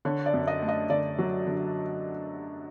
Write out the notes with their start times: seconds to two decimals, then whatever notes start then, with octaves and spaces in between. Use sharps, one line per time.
0.05 D3 C#5
0.26 D5
0.34 F#2
0.47 D#5
0.62 A3
0.68 D#5
0.90 D3 D5
1.19 F#3
1.47 D3